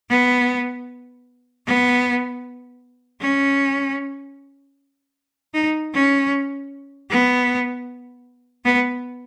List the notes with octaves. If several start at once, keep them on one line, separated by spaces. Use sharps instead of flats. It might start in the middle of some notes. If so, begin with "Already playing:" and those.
B3
B3
C#4
D#4
C#4
B3
B3